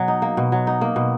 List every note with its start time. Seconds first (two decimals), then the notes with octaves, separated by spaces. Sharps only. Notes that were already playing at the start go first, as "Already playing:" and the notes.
Already playing: B2 F#3
0.08 D#4
0.22 A#3
0.37 B2
0.52 F#3
0.67 D#4
0.81 A#3
0.96 B2